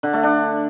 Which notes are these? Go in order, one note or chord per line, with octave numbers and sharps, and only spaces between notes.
D3
A3
D4